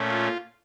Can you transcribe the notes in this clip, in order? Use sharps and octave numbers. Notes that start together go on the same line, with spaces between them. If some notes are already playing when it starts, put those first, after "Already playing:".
Already playing: A#2 A3 C#4
F4